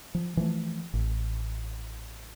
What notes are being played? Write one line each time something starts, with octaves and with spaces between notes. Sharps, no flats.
F3
E3 F3 A3
A1